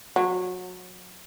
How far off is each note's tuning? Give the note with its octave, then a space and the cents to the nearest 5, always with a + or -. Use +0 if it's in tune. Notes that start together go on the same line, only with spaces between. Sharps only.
F#3 -25